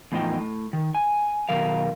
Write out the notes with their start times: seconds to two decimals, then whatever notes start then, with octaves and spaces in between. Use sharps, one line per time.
0.12 E2 A2 F3 D#4 E4 G5
0.37 A2
0.73 D#3
0.95 G#5
1.49 B2 D#3 F#3 A#4 F5